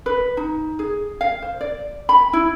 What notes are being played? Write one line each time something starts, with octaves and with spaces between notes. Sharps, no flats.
B4
D#4
G#4
F5
C5
D5
B5
E4